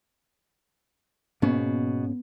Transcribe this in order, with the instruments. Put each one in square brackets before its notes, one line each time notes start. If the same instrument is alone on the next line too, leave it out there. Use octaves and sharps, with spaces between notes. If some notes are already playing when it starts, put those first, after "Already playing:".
[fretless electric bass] G#2 A#3 C#4 [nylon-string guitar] B2